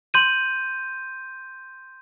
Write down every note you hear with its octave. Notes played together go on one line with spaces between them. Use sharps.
C6 G6 D#7